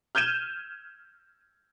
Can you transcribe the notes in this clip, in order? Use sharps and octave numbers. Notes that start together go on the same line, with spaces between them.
F6 G6 G#6 D#7 E7